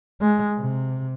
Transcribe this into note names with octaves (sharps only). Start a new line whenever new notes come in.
G#3
C3